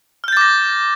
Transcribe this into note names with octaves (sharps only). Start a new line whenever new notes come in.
D6 F6 G6 A6 A#6